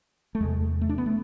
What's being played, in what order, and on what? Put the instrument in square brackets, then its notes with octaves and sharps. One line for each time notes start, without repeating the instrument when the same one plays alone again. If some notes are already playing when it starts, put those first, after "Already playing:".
[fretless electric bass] A3
E2 C3 G#3
A3
D4
B3
A3